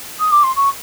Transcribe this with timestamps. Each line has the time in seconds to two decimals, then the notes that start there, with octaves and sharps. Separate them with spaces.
0.20 D#6
0.32 D6
0.43 C6
0.56 C#6